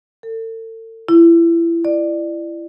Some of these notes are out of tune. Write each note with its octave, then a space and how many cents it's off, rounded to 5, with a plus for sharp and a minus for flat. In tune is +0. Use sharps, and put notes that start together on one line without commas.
A4 +40
E4 +30
D5 +20